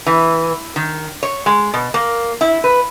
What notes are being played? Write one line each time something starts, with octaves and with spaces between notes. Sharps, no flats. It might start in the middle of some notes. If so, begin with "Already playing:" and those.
E3
D#3
C#5
G#3
B2
A#3
E4
B4